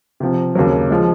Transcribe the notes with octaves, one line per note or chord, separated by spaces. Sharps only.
C3 F3 C4
D#2 C#3 F#3
F3 G#3